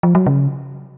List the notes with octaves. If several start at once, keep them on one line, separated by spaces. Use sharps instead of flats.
F3
F#3
C#3